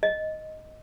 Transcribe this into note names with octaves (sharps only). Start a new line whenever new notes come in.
D#5